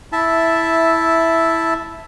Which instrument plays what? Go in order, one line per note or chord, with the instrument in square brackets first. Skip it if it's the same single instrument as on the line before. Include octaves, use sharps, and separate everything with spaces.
[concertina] E4 E5 A5